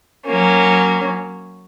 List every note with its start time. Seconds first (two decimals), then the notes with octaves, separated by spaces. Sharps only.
0.25 F#3 A#3 C#4